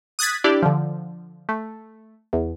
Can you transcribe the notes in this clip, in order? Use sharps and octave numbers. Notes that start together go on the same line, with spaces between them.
D#6 F#6 G#6 A6 B6
D4 E4 G4 D5
D3 F3
A3
E2